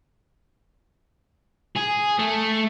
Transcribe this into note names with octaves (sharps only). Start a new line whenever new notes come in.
G#4
A3